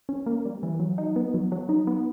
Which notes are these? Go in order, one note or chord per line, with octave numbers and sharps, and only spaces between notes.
C#4
A#3
G3
E3
F#3
D#4
B3
F#3
F#3
D#4
B3